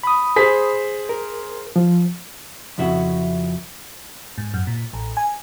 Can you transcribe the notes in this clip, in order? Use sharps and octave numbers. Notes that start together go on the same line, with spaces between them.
B5 D#6
G#4 C5 B6
A#4
F3
F2 C#3 E4 F#4 E5
G#2
F#2
A#2
A1
G#5